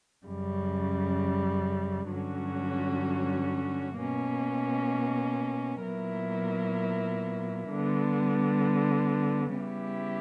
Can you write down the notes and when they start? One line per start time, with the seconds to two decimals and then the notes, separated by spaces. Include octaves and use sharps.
0.25 F#2 C#3 G3
2.11 G2 D3 F#3 C#4 F#4
3.98 B2 A#3 C#4
5.83 A#2 F#3 B3 E4 A#4
7.69 D3 G3 B3
9.55 C#3 G3 B3 E4 G4